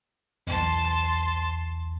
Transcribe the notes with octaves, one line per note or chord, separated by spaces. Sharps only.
B1 E2 A5 C6